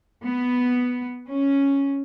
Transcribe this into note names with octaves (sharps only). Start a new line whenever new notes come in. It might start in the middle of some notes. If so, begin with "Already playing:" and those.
B3
C#4